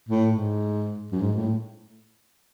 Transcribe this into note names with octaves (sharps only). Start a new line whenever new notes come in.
A2
G#2
F#2
G#2
A2